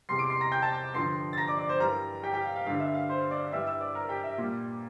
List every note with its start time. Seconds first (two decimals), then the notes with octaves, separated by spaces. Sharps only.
0.09 E2 C3 G3 C6 C7
0.19 D6 D7
0.30 C6 C7
0.40 A#5 A#6
0.52 G5 G6
0.62 A5 A6
0.94 G2 D3 F3 C6 C7
1.33 A6
1.37 A#5 A#6
1.48 D5 D6
1.58 D5 D6
1.69 C5 C6
1.80 G2 E3 G3 A#4 A#5
2.23 G4 G5
2.34 G4 G5
2.44 F5
2.56 F5
2.66 G2 D3 G3 F5
2.80 E5
2.95 F5
3.09 C5 C6
3.31 D5 D6
3.52 G2 E3 G3 E5 E6
3.67 E5 E6
3.81 D5 D6
3.95 A#4 A#5
4.09 G4 G5
4.24 E5
4.38 A#2 G3